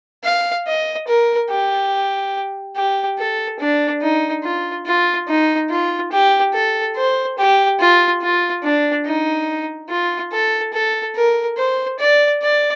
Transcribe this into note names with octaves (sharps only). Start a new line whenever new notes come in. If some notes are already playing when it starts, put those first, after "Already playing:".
F5
D#5
A#4
G4
G4
A4
D4
D#4
F4
F4
D#4
F4
G4
A4
C5
G4
F4
F4
D4
D#4
F4
A4
A4
A#4
C5
D5
D5